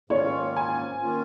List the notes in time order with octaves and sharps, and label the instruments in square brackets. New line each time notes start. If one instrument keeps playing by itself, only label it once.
[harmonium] G#2 D#3 A#3 C#4 F4 [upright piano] C#5
[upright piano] G#5
[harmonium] D#3 A#3 C#4 F4